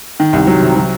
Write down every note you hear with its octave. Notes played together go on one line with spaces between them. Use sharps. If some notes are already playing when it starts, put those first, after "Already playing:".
D#3
C2
F#3
C3
F#3